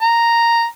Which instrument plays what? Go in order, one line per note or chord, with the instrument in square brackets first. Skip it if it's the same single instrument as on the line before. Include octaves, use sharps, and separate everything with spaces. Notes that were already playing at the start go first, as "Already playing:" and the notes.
[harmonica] A#5